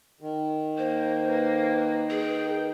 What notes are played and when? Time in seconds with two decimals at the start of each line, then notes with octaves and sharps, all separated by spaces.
0.21 D#3
0.78 A#3 C5
1.28 A#3 B4
2.10 G#4 G5